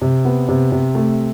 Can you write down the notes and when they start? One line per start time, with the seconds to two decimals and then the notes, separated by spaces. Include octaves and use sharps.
0.02 C3
0.25 B3
0.49 C3
0.72 C3
0.95 A3